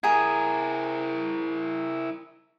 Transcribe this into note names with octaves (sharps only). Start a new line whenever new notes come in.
E4 G#4 A#4 A#5 G#6